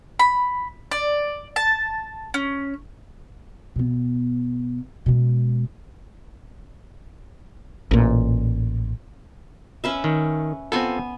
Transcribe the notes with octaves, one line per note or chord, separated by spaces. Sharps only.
B5
D5
A5
C#4
B2 B3
B2 G#3
A1 A#2
C#4 B4 E5
D#3
B3 C4 F4 A4 G#5